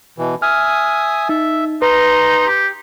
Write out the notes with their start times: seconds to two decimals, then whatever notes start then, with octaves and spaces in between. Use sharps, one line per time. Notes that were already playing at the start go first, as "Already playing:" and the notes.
0.18 B2 E3
0.42 E5 G#5 D#6 F6
1.29 D#4 E5
1.82 D#4 B4 A#5 C6
2.47 G4